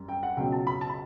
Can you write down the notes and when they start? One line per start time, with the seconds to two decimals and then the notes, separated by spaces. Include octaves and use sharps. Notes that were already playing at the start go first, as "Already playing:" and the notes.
Already playing: F#2 G3
0.08 G5
0.23 F#5
0.37 C#2 B2 F#3 G5
0.52 A5
0.67 B5
0.81 A5
0.89 B5